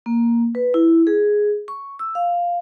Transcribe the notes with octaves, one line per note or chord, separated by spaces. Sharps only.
A#3
B4
E4
G#4
C#6
E6
F5